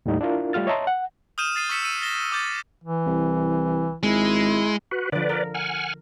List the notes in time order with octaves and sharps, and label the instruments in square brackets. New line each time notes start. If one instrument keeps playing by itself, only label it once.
[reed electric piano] D#2 A2 D#3 G3 D#4
D4 E4 F4 A#4
G3 A3 F4 F6 A6
C#5 D#5 E5 A5 A#5 C6
F#5
[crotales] D#6 F6 G6 D#7 E7
D#6 A6 C7 D#7
C#6 E6 B6 C#7 E7
E6 C#7 D#7 E7
A6 A#6 E7 G7
D6 E6 G6 A6
[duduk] E3
[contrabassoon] C2
[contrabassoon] G#1 [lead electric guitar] G#3 [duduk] E4
[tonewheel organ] F#4 B4
[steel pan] D3 F3 [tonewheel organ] B4 D5
[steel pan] A#4
[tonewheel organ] F#5 G#5 F6